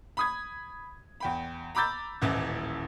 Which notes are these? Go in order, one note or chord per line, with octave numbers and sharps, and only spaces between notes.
B5 D#6 G#6
E2 G5 B5
A#5 B5 D6 E6 G6 A6
D#1 A1 E3 E4